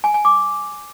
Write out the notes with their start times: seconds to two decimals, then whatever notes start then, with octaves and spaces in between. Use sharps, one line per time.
0.04 G#5
0.14 G#5
0.25 D6